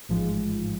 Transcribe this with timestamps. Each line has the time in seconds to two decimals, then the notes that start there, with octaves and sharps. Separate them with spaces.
0.09 A1 G#2 F3 G#3